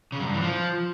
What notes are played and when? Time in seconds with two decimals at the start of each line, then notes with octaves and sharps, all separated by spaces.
0.12 C#3
0.19 F#2
0.27 G2
0.34 E3
0.41 F3